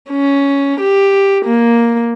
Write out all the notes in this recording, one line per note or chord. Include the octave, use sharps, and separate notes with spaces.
C#4
G4
A#3